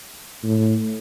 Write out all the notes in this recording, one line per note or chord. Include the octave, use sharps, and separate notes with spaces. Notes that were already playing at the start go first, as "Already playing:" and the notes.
A2